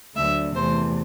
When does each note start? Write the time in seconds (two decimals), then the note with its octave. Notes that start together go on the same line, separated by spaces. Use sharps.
0.16 D2 D3 F#3 A3 E5
0.55 E2 C3 E3 A3 C5